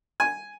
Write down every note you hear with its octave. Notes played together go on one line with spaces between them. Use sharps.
G#5